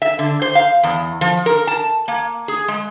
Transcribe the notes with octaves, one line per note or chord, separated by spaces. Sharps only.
E5
D3
C5
F5
E2
F3
A#4
A5
A#3
G#4
G#3